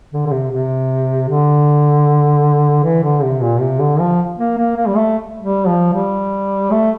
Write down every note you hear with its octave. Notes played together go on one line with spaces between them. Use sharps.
D3
D3
C3
C3
D3
E3
D3
C3
A#2
C3
D3
F3
A#3
A#3
A#3
G3
A3
G3
F3
G3
A3